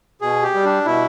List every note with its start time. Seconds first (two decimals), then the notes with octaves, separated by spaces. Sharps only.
0.21 B2 G#4
0.43 G4
0.54 G3
0.65 D4
0.85 B2 E4